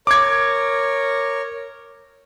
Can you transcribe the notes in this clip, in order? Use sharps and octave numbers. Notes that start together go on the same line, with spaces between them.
A#4 C#5 D6 G#6